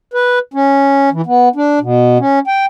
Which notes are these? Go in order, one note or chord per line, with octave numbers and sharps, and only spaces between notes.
B4
C#4
E3
B3
D4
B2
C#4
G5